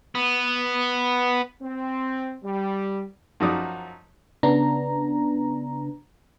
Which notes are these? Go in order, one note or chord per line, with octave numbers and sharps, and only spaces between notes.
B3
C4
G3
F#2 F3 D#4 F#4 D5 D#6
C#3 B3 D4 A#5